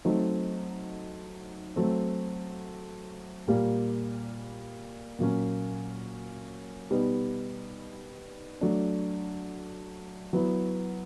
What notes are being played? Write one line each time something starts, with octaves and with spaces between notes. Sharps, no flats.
F#3 A3 C4 D#4
F#3 A3 C4
A#2 G3 A#3
A#2 F#3 A#3 C#4
B2 G3 B3 D#4
F#3 A3 D4
F#3 B3 E4